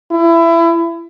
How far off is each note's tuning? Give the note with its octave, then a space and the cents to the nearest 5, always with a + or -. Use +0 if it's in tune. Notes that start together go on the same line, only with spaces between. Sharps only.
E4 +25